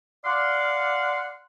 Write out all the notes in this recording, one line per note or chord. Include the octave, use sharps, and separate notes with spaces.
D5 F5 F#5 C6